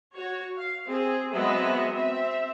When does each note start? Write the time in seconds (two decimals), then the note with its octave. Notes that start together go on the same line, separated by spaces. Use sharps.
0.14 F#4 C#5
0.57 F5
0.87 C4 G#4
1.34 F#3 G#3 B3 C4 D#5 E5
1.92 C4 E5